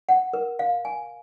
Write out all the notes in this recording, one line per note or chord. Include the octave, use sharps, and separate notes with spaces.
F#5
A#4
F5
G#5